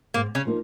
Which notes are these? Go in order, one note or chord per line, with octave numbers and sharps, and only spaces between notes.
G#2 A#3
C#3 C#4
F3 A#3 D#4